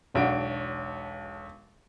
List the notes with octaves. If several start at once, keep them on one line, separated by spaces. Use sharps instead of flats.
E1 B1 D4 F#4 D7